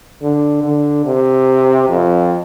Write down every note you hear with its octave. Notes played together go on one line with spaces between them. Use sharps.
D3
D3
C3
F2